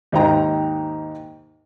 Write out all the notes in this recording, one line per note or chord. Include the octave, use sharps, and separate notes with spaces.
D#2 G#2 D#4 D#5 G5 A#5